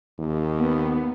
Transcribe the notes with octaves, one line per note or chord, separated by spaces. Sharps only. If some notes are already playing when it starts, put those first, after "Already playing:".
D#2
B3